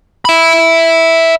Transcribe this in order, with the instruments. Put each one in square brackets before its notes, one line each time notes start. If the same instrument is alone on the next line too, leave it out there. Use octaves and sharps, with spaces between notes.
[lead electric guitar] E5 B5